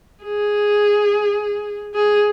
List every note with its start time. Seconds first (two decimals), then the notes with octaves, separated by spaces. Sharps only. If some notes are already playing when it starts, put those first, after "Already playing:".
0.24 G#4
1.94 G#4